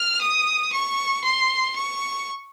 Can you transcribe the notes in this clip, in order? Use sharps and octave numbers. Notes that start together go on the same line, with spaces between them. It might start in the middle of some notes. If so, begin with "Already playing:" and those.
Already playing: F6
D#6
C#6
C6
C#6